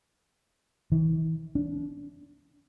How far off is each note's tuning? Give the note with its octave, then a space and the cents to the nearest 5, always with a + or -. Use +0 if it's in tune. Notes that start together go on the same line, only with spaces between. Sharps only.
E3 -40
D4 -30